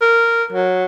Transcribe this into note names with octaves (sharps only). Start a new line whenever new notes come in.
A#4
F#3